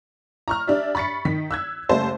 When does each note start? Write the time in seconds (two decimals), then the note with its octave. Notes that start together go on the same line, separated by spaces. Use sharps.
0.48 A#5 C#6 F6
0.67 D4 G4 D5 E5
0.95 B5 C#6 A6 B6 C#7
1.25 D#3 B6
1.51 E6 F#6 G#6
1.89 F#1 G3 A3 C5 A5 C6